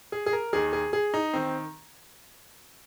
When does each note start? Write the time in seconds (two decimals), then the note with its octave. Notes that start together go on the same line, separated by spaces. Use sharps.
0.12 G#4
0.26 G#4
0.33 A#4
0.53 D#2 D#3 G#4
0.73 G#4
0.93 G#4
1.14 D#4
1.33 D#3 C4